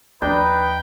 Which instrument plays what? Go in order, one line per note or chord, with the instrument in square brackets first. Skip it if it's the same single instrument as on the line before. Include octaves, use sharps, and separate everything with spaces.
[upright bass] D#2 F3 [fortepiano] D4 [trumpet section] D#4 B4 [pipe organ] G5